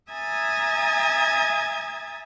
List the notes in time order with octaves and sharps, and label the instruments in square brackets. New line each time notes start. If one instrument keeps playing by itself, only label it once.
[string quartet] E5 G#5 A#5 D#6 G#6 A6